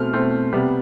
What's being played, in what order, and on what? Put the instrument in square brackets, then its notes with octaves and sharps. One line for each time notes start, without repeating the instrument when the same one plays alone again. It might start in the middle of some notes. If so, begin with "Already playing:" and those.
Already playing: [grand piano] B2 A3 C4 F6
B2 A3 C4
C3 G3 B3